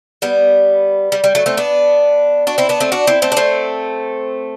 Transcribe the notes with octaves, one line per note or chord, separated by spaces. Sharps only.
G3 B3
G3
G3
F#3 A3
A3 C4
B3 D4
D4 F#4
C4 E4
B3 D4
A3 C4
D4 F#4
C4 E4
A3 C4
D4
A3 C4